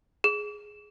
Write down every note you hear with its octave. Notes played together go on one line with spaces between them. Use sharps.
G#4